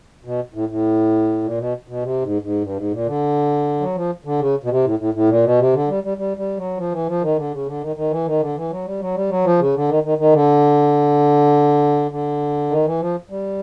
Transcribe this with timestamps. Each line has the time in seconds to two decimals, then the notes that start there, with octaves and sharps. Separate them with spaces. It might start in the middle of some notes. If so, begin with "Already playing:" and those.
0.25 B2
0.54 A2
0.69 A2
1.43 A#2
1.58 B2
1.88 B2
2.03 C3
2.23 G#2
2.42 G#2
2.62 G2
2.77 G#2
2.91 A#2
3.07 D3
3.81 F#3
3.95 F3
4.25 D3
4.40 C#3
4.64 B2
4.70 C3
4.84 A2
4.99 A2
5.14 A2
5.29 A#2
5.44 B2
5.59 C3
5.73 D3
5.88 G3
6.04 G3
6.18 G3
6.37 G3
6.57 F#3
6.77 F3
6.92 E3
7.07 F3
7.21 D#3
7.37 D3
7.51 C#3
7.66 D3
7.81 D#3
7.96 D#3
8.11 E3
8.26 D#3
8.40 D3
8.56 E3
8.70 F#3
8.85 G3
9.00 F#3
9.14 G3
9.30 F#3
9.44 F3
9.59 C#3
9.74 D3
9.89 D#3
10.03 D#3
10.18 D#3
10.33 D3
12.11 D3
12.70 D#3
12.85 E3
13.00 F3
13.30 G3